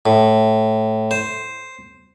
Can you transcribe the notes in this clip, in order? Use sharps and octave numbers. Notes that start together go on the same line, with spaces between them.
A2
C5